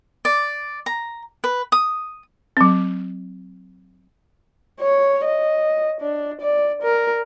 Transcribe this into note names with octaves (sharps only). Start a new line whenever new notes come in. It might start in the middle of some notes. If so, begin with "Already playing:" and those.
D5
A#5
B4
D#6
F#3 C4
C#5
D#5
D4
D5
A#4